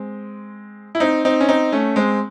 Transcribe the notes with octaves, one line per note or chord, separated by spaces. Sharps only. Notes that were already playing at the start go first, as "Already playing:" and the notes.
Already playing: G#3 C4
E4
C4 D#4
C4 D#4
C#4
C4 D#4
A3 C#4
G#3 C4